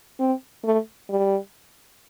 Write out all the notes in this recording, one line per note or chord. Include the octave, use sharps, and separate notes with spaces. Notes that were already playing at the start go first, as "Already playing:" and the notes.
C4
A3
G3